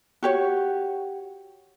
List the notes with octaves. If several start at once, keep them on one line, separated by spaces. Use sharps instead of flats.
F#4 G4 C#5